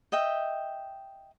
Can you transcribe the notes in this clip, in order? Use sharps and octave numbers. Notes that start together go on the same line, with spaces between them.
D#5 E5 G5